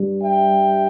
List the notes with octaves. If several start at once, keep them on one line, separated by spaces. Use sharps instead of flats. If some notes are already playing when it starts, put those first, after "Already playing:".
Already playing: G2 G3
E5 G5